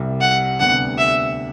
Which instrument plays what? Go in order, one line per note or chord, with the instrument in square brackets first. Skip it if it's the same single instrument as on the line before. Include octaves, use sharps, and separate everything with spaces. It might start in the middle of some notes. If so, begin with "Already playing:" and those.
Already playing: [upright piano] C2 C3 G3
[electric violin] F#5
[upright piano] D2 C3 G3 B3 D4 [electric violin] F#5
[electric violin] E5